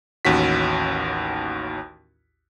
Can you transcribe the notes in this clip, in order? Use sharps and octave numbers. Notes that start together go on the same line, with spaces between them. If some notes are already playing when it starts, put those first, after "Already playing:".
A1 D#2 C#4 F#4 B6